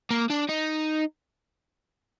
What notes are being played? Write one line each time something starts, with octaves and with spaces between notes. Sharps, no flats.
A#3
D4
D#4